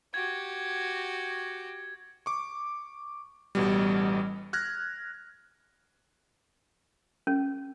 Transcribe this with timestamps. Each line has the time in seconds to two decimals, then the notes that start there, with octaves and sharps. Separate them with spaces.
0.14 F#4 G4 G#6
2.26 C#6 D6
3.55 A1 B2 G3
4.53 F6 F#6 G#6 A#6
7.27 C#4